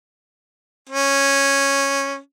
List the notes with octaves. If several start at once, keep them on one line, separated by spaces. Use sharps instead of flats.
C#4